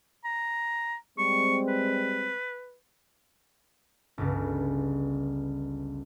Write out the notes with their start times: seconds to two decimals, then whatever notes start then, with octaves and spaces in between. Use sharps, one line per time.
0.25 A#5
1.18 G3 G#3 C4 C#6
1.68 B4
4.18 G1 C#2